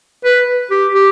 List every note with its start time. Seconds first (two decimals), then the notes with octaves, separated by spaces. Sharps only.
0.24 B4
0.70 G4
0.95 G4